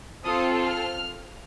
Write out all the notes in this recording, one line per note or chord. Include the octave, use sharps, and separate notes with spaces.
C4 F4 A4 D#6
F6